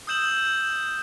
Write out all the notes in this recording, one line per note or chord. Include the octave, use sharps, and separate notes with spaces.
D#6 E6 G6 E7 F#7